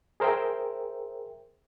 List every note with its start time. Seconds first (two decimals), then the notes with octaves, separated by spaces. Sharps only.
0.20 G#4 A#4 C5 E5 G5